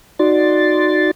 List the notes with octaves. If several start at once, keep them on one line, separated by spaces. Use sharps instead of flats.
D#4 F#4 D5 C6 A6